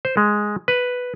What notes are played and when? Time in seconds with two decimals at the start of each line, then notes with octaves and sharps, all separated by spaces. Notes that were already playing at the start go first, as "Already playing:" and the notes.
0.05 C5
0.17 G#3
0.68 B4